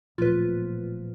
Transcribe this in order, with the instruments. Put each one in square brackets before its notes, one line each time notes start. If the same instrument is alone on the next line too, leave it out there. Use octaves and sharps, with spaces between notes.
[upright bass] D1 [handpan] A#2 F3 [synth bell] F4 B4